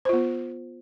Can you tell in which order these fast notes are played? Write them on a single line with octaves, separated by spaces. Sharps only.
C5 F4 B3